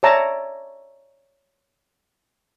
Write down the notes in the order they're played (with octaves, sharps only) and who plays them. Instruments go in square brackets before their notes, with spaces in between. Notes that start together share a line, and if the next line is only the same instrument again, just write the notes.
[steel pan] C#5 D5 E5 A5 A#5